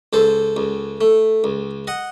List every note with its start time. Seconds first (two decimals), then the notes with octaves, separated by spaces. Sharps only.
0.13 C#2 A4 C5
0.57 C#2
1.01 A3
1.44 C#2
1.87 D#5 F#5